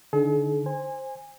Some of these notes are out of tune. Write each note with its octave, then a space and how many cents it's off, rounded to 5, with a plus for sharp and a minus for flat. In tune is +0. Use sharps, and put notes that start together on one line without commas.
D3 -5 D#4 +0 G#4 +45
C5 +10 G#5 -20